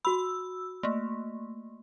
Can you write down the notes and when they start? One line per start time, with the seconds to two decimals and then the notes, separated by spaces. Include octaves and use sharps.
0.05 F#4 B5 E6
0.83 A3 A#3